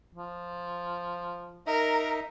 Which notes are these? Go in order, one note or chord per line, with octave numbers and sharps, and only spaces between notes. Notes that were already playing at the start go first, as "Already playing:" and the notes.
F3
D#4 A#4 D#5 E5